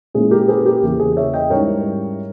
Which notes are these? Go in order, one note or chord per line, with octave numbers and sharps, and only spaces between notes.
A#2 G#3 C#4 E4 G#4
G4 A#4
G#4 B4
G4 A#4
E2 C#3 E3 A#3 E4
G#4
C#5 E5
D#5 G5
G#2 G3 C#4 E4 A#4 C#5